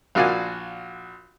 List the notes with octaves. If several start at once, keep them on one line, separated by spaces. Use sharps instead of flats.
A#1 F4 F#4 D5 F5 G#5